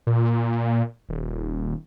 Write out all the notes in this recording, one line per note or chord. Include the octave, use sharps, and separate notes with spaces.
A#2
D#1